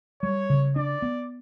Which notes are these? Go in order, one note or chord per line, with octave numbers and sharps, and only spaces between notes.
G3 C#5
C#3
D4 D5
B3